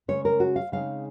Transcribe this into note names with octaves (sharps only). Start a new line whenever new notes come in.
C#3 G#3 C#4 C#5
A#4
F#4
F5
C#3 G#3 C4 D#4 F5